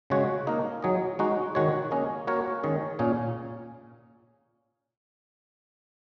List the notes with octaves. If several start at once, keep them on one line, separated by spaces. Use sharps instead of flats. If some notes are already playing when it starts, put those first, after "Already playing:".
C#3 G#3 F#4 C#5
A#3 D#4 A#4
F#3 D#4 G#4 D#5
G#3 D#4 F#4
D#3 G#3 F#4 C#5
A#3 C#4 G#4 D#5
A#3 F#4 A#4 C#5
D#3 G#3 C#4 G#4
A#2 A#3 C#4 G#4